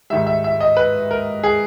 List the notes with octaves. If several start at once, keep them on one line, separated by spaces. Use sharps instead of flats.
G#2 D#3 G3 E5
E5
E5
D#5
B4
A#4
G#4